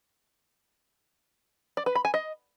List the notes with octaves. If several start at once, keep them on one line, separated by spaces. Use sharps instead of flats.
D5
B4
B5
G#5
D#5